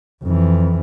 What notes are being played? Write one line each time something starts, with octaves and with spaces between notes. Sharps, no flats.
F2 E3